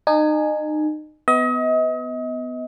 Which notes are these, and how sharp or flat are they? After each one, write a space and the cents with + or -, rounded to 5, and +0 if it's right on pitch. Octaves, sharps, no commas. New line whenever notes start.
D#4 -30 G#5 +10
B3 +15 D#5 +35